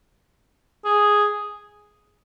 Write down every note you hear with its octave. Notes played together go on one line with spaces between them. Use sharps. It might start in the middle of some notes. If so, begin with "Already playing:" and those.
G#4